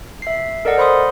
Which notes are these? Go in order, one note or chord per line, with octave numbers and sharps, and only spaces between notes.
E5 C7
A4 A#4 D5 D#5 F#5
C5 B5 C6 D#6